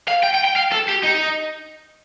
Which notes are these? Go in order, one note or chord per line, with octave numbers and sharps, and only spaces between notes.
F5
G5
G5
G5
F5
A4
G4
D#4